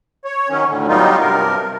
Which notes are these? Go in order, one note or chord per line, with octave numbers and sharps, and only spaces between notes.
C#5
D#3 F#3 C#4
D2 A2 D3
F#3 G3 B3 D#4 F4
G2 C3 A#4